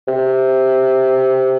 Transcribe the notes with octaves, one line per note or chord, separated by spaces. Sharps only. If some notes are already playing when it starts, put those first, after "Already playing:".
C3